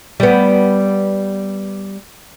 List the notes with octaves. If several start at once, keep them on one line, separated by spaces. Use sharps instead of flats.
G3 B3